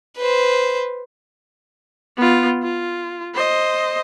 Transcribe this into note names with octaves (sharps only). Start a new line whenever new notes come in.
B4 C5
B3 F4
F4
C5 D#5